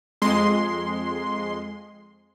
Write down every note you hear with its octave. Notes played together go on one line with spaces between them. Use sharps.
F2 G#3 C6